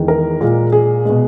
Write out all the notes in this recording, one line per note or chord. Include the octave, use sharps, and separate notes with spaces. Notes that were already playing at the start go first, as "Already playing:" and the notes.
Already playing: E2 D#3 G#3
A#4
A#2 G#3
G#4
B2 G#3